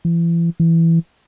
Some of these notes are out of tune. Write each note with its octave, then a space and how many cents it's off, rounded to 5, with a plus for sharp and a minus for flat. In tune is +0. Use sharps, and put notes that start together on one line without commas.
E3 +35
E3 +5